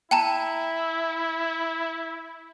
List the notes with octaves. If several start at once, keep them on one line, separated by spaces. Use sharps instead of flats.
E4 G5 A5 A#5